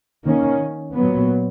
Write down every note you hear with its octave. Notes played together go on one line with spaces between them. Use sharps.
D#3 A#3 C#4
A#2 F#3 B3